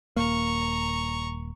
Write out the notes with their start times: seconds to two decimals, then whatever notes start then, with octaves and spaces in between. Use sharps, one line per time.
0.16 D#1 A#3 A#5 C#6